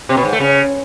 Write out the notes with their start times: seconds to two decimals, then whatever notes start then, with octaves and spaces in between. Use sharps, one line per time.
0.09 C3
0.17 B2
0.25 G#2
0.33 A3
0.40 C#3